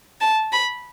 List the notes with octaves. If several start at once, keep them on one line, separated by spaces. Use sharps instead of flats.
A5
B5